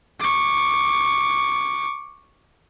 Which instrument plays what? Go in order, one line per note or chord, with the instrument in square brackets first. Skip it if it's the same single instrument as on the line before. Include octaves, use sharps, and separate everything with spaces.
[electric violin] C#6 D6